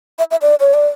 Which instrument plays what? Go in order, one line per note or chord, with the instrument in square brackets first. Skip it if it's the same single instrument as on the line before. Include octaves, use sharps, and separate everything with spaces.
[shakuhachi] E5
E5
D5
C#5
D5